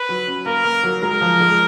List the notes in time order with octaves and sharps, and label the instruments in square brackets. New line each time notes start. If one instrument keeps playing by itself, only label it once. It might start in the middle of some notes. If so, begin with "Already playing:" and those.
Already playing: [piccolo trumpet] B4
[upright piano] F#3
C#4
[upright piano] A#3 [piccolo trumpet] A#4
[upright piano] A#3
F#3
[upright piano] G#3 [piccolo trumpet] A#4
[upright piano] F3
G#3